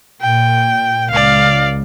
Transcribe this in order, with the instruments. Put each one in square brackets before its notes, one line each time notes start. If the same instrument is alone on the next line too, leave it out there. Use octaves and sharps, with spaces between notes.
[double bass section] A#2 [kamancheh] G5
[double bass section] C#2 [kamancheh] D5 F5